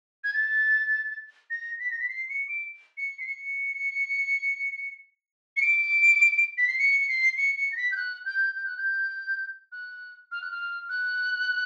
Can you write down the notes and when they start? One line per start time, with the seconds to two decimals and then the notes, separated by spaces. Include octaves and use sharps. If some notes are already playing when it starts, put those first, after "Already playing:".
0.24 G#6
0.33 A6
1.50 A#6
1.80 B6
1.91 A#6
2.00 B6
2.09 C7
2.29 C#7
2.48 D7
2.97 C#7
3.20 C7
3.26 C#7
5.57 C#7
5.62 D7
6.58 B6
6.68 C7
6.79 C#7
7.00 C#7
7.09 C7
7.37 C#7
7.57 C#7
7.72 A#6
7.77 B6
7.92 G6
7.97 F#6
8.25 G6
8.55 G6
8.66 F#6
8.78 G6
9.72 F#6
10.32 F6
10.42 F#6
10.51 F6
10.89 F#6